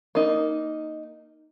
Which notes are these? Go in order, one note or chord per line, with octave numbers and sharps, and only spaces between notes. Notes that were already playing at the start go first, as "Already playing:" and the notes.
A#3 D#4